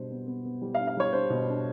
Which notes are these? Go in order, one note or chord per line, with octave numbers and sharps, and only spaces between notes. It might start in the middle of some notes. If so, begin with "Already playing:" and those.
Already playing: B2 G3 D4 C5
B3
B3
B3
G3
F5
D4
F5
G3 C#5
D4 C5
B2
D4